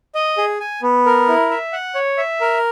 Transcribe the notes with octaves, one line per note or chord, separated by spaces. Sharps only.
D#5
G#4
G#5
B3
A#4
E4
E5
F#5
C#5
E5
A#4